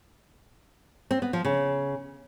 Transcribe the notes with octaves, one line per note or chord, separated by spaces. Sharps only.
C4
B3
F3
C#3